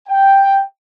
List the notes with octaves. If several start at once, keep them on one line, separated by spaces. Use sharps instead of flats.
G5